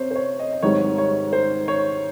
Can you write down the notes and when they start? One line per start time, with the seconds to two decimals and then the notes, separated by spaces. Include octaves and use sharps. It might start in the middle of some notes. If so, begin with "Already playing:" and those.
Already playing: C3 C5 C#5
0.11 C5
0.16 C#5
0.40 D#5
0.52 D#5
0.63 G#1 G#2 G3 C#5
0.98 C#5
1.33 C5
1.68 C#5